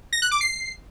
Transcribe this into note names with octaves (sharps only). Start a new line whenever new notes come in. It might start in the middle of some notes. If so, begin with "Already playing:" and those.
A#6
F#6
D6
C7